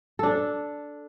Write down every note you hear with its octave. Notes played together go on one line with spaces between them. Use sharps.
D4 A4